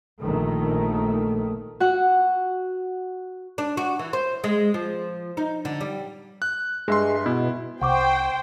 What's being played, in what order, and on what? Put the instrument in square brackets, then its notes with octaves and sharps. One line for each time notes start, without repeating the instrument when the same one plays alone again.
[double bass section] A#1 D#3 A3
[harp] F#4 F#5
[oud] D4
F#4
E3
C5
G#3
F3
D#4
D3
G3
[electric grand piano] F#6
[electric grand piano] G2 E5 C6 [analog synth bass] G#3
[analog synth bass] B2 [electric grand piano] E4
[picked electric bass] C2 [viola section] C5 [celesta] F#5 C#6 D6 [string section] G5